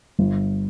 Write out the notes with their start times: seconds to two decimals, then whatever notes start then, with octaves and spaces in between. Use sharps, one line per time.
0.19 G1